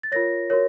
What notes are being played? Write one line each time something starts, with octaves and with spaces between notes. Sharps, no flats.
A6
F4 A#4 C#5 A#6
F#4 A#4 C#5